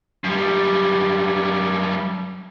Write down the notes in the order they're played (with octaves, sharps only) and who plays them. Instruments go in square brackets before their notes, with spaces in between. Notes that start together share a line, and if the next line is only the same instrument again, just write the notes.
[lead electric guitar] F#2 G3